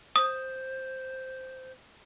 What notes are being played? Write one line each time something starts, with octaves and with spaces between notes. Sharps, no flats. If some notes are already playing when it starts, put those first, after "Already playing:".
C5 D#6